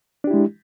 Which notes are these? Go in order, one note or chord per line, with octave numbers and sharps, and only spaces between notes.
G#3 D4 E4 G4